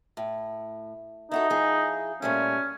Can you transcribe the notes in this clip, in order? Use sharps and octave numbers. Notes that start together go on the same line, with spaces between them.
A2
D#4 E4 F#4 A4
F3 E4 G#4
A#2 G3 A3 C#4